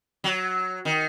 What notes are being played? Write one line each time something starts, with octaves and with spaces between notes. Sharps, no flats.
F#3
D#3